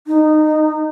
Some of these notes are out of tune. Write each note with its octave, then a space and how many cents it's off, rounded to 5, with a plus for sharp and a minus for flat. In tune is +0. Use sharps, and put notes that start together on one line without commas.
D#4 -15